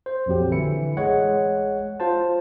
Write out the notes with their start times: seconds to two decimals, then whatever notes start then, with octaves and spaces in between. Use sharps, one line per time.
0.06 C5
0.26 A#1 F2 F#3 G4
0.51 D3 E3 E4 C#7
0.97 A1 G#3 C#5 F#5
2.00 F4 C5 A5